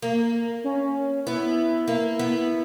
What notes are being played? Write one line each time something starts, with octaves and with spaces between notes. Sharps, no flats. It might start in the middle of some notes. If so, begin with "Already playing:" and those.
A#3
C#4
B3 E4
A#3
B3